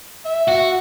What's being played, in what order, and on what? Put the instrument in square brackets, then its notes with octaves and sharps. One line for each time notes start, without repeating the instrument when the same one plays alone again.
[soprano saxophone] E5
[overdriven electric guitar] F#4